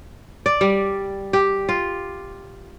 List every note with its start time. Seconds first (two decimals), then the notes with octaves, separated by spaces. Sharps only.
0.46 D5
0.61 G3
1.33 G4
1.69 F4